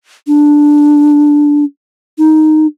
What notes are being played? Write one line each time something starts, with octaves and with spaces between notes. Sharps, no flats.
D4
D#4